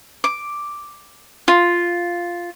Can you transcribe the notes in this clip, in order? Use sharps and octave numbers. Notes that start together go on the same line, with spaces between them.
D6
F4